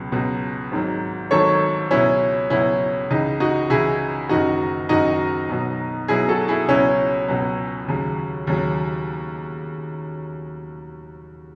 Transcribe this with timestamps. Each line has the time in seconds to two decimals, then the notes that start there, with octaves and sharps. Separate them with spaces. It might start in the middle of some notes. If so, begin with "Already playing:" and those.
Already playing: C#2 B2 F#3
0.12 C#2 B2 F#3
0.71 G#1 G#2 D#3 F#3
1.31 G#1 G#2 D#3 F#3 A4 C#5
1.91 C#2 B2 F#3 C#4 E4
2.50 C#2 B2 F#3 C#4 E4
3.10 C#2 C#3 E3 D#4
3.40 D#4 F#4
3.70 C#2 C#3 E3 E4 G#4
4.29 F#1 F#2 D#3 D#4 F#4
4.89 F#1 F#2 D#3 D#4 F#4
5.49 B1 B2 F#3
6.08 B1 B2 F#3 E4 G#4
6.29 F#4 A4
6.48 E4 G#4
6.68 C#2 B2 F#3 C#4 E4
7.28 C#2 B2 F#3
7.88 D#2 C#3 F#3
8.47 D#2 C#3 F#3